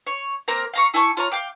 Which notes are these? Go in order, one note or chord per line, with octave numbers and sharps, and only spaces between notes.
C#5
A#3 C4 A#4 A#5
F5 A#5 C#6
E4 G#5 A5 C#6
F4 C#5 A#5
F5 G5 D6